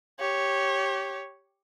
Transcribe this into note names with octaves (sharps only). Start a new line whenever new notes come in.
G4 C#5